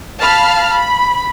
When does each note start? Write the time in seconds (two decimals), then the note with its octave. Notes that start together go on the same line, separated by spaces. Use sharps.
0.21 F5 A5 B5 F6
0.71 B5